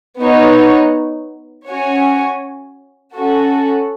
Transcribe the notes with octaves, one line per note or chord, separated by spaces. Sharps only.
B3 D#4 F#4 C#5
C#4 F#4 C#5 G#5
C#4 F#4 A4